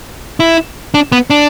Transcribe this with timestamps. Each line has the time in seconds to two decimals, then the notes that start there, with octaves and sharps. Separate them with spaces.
0.40 E4
0.94 D4
1.12 B3
1.30 D4